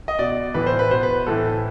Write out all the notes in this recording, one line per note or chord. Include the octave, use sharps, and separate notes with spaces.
D#5
B2 D5
A2 E3 B4
C5
B4
B2 C5
B4
A2 E3 A4